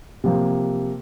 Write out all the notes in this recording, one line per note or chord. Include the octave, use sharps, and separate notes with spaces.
C3 F3 A#3